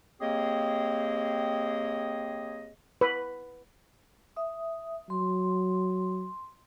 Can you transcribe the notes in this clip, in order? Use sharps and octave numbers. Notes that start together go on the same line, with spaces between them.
A#3 C4 G4 G#4 C#5 D#5
B4
E5 D#6
F#3 C6